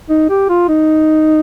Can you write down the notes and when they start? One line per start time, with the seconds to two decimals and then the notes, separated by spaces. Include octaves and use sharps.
0.09 D#4
0.29 G4
0.49 F4
0.69 D#4